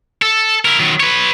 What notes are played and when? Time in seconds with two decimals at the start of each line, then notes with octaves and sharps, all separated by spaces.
0.22 A4
0.65 E4 A#4
0.80 D#3 F#3
1.00 B4 C#5